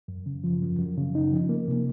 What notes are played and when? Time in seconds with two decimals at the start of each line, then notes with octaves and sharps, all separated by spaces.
0.08 F#2
0.26 C#3
0.44 F3
0.62 F#2
0.79 F#2
0.97 C#3
1.15 D#4
1.32 F3
1.49 A#3
1.68 C3